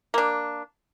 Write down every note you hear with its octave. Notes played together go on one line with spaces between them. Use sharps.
A#3 D4